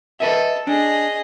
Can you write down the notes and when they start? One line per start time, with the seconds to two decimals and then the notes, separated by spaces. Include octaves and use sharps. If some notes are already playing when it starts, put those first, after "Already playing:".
0.20 A4 B4 D#5 E5
0.67 D4 G#4 D#5